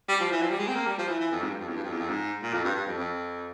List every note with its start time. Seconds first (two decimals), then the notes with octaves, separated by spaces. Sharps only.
0.09 G3
0.20 F3
0.31 E3
0.42 F3
0.50 G3
0.59 G#3
0.68 C4
0.76 A#3
0.87 G3
0.98 F3
1.09 E3
1.20 E3
1.31 F2
1.42 G#2
1.50 G2
1.59 F2
1.68 E2
1.76 G2
1.84 F2
1.92 E2
2.00 F2
2.09 G#2
2.43 A#2
2.53 F2
2.65 G2
2.75 G2
2.86 F2
2.98 F2